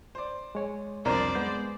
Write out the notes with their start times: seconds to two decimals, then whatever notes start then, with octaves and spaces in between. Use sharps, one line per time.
0.15 C5 D5
0.55 G#3 C#5 G#5
1.05 C2 F2 D4 A#4 C5 D5
1.35 G#3 B3 G6